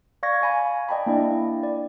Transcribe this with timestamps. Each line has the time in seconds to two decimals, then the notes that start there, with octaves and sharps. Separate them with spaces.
0.23 D5 F5 C#6 G#6 A#6
0.42 F5 G#5 B5
0.89 D5 D#5 G5 A5 B5
1.06 A#3 D4 E4 D5
1.63 D5